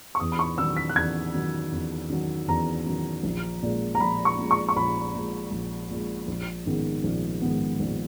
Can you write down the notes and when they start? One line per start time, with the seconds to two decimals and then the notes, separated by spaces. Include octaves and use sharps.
0.15 C#6
0.20 E2 D#6
0.32 B5
0.39 C#6
0.58 D#3 F#3 E6
0.77 B6
0.89 F#6
0.96 E2 G#6
1.34 D#3 F#3
1.72 E2
2.09 D#3 F#3
2.48 E2 A#5
2.86 D#3 F#3
3.23 A#1
3.62 A#2 G#3
3.95 A#5
4.00 A#1 B5
4.25 C#6
4.38 A#2 G#3
4.51 C#6
4.69 C#6
4.76 A#1 B5
5.15 A#2 G#3
5.51 A#1
5.90 A#2 G#3
6.28 A#1
6.65 G#2 D#3 G#3 B3
7.04 A#1
7.42 G#2 D#3 G#3 B3
7.80 A#1